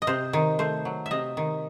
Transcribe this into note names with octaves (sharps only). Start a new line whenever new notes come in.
D#5
C3 C5
D#3
A3 C5
F#3
E5
C3 D#5
D#3